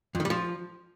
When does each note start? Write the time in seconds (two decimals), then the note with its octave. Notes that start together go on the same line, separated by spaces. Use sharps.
0.15 F2
0.20 D#3
0.25 G3
0.30 F3